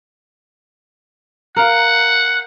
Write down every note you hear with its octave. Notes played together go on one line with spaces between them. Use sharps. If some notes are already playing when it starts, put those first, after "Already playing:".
A#4 F5 F#5